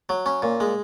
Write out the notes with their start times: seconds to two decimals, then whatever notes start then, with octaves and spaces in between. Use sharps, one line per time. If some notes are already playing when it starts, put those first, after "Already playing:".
0.09 F#3
0.26 C#4
0.42 A#2
0.60 G#3